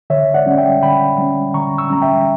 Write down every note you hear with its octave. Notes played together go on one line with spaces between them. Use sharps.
D3 C#5 E5
D5 F#5
G3 C#4
E5 G5
D3 G5 B5
G3 C#4
D3 A#5 C#6
C#6 E6
G3 C#4 A#5
E5 G5